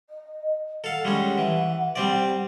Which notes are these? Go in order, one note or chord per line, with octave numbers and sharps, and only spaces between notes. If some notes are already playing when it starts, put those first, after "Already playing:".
D#5
A4 F5 F#5
G3 G#3 C#4
E3
G3 C4 D5